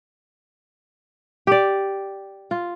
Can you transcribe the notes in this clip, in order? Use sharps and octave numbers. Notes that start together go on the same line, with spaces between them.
G4 D5
F4